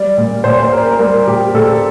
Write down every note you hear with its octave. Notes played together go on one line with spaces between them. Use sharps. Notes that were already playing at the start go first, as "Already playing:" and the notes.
Already playing: G3 D5
A#2
A#2 C5
C5
A#3 A#4
A#4
G3 A#4
A#2 G4
A#2 A4